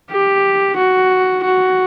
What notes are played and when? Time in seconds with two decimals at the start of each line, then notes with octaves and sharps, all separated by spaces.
0.11 G4
0.77 F#4
1.44 F#4